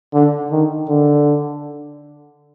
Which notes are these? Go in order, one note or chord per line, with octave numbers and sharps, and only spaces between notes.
D3
D#3
D3